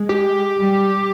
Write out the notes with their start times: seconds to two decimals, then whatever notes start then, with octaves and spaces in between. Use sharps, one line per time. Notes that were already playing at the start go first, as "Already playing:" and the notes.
Already playing: G#3
0.09 G4
0.57 G3